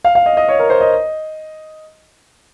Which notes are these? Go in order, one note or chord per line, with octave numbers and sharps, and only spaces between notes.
F5
F5
D#5
D#5
C#5
A#4
C5
D#5